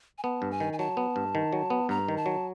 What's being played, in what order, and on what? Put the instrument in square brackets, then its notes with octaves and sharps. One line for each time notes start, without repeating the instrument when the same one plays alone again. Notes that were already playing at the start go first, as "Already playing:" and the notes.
[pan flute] G#5
[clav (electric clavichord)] B3 [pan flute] A5
[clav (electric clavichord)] G2
[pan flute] G#5
[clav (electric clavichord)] D#3
[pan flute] G#5
[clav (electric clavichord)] F#3 [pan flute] A5
[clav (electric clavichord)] B3
G2
D#3
F#3
B3
[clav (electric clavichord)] G2 [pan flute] A#5
[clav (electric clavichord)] D#3
[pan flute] A5
[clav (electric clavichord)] F#3